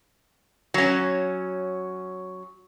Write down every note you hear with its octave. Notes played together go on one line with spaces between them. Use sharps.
F#3 C#4